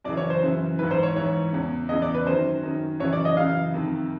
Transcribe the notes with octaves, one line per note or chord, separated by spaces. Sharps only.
F#2 C#3 E3 D5
C#5
C5
F#2 C#3 E3
G#2 E3 B4
C5
C#5
G#2 E3 C#5
E2 C#3 E3
E2 C#3 E3 D#5
D5
B4
F#2 D#3 C5
F#2 D#3
F#2 C#3 E3 C#5
D5
D#5
F#2 C#3 E3 F5
F2 C3 D#3